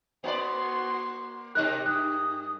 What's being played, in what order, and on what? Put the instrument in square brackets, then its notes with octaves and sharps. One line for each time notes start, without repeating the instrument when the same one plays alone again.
[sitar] A#3 D5 [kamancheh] F#4 C6
[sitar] B2 D#4 A#4 [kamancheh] G4 [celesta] F#6
[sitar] G2 [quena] D#6 [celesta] F#6